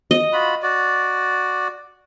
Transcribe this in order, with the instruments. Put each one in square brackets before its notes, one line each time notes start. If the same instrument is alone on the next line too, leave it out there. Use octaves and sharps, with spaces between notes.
[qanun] D#5
[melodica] F4 F#4 B5
F#4 D5